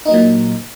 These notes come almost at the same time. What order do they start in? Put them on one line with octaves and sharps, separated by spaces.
D#4 A#3 F#3 A#2